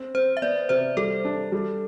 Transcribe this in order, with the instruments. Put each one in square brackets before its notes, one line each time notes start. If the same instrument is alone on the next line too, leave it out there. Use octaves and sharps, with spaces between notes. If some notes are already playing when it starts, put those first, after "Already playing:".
Already playing: [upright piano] C4
[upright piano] C4 [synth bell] C5
[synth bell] E5
[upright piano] B3 [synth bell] D5
[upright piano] C3 [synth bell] C5
[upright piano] G3 [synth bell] A4
[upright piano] D4
G3